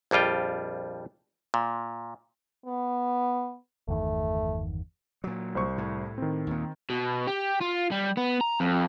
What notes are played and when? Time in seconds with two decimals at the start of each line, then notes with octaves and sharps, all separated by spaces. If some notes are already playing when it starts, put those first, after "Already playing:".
0.11 A#1 F2 G3 F4 G5
1.54 A#2
2.66 B3
3.88 G1 E2 D#3 A3
5.24 A#2 F#3
5.55 C2 C5 C#6
5.78 A2
6.18 D#3 C4
6.47 D#2 A#2
6.90 B2
7.27 G4
7.61 F4
7.91 G3
8.17 B3
8.41 A#5
8.60 F2